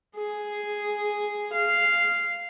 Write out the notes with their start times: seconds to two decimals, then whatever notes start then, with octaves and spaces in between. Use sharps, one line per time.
0.17 G#4
1.54 F5